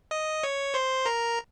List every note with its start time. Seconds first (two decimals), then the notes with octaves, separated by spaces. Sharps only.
0.11 D#5 D#6
0.43 C#5 C#6
0.74 C5 C6
1.05 A#4 A#5